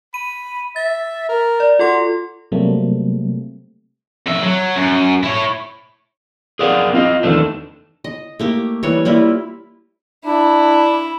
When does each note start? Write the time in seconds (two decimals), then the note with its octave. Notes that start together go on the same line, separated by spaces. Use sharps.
0.14 B5 D#7
0.76 E5 A6
1.29 A#4
1.60 D5
1.79 F4 F#4 A4 C6
2.52 C3 F#3 G3 A3 A#3 C4
4.27 F2 E5
4.43 F#3
4.76 F#2
5.23 E4 C#5
6.59 G#4 A#4 D5 F5 F#5
6.93 C4 F4 D#5
7.23 E2 D#3 A3 D4
8.04 D#5
8.39 A3 A#3 G4
8.83 E3 G3 C#5
9.05 G3 A#3 E4 F4
10.25 D4 E4 B5